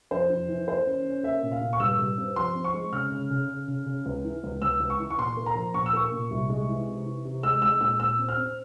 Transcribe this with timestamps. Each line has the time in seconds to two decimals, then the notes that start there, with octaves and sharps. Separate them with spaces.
0.11 F2 C5
0.30 F2
0.49 E3
0.67 A#3 C5
0.87 C#4
1.05 C#4
1.23 A#3 E5
1.43 A#2
1.52 F5
1.61 A#2
1.73 C#6
1.80 G2 E6
1.99 G2
2.18 C4
2.36 F3 C6
2.55 C4
2.64 C#6
2.74 G#3
2.93 C#3 F6
3.11 C#3
3.30 C#3
3.49 C#3
3.68 C#3
3.86 C#3
4.06 C#2
4.24 E3
4.44 C#2
4.62 C#2 E6
4.80 C#2
4.90 C#6
4.99 E3
5.11 C#6
5.18 A#2 C6
5.37 A#3
5.46 A#5
5.55 F3
5.74 A#2 C#6
5.86 E6
5.93 A#3 C#6
6.12 A#2
6.31 C2
6.49 G#3
6.69 E3
6.88 C3
7.06 E3
7.25 C3
7.43 G#3 E6
7.62 G#3 E6
7.80 A#2 E6
7.99 A#2 E6
8.19 C4
8.29 F6
8.37 C4